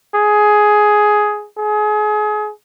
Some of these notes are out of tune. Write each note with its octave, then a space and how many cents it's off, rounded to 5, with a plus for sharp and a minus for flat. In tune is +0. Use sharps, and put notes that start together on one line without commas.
G#4 +10
G#4 +30